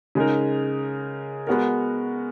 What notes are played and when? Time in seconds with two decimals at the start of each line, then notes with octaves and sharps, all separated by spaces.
0.15 C#3 G#3 D#4 A#4
1.47 G#3 B3 F#4 A#4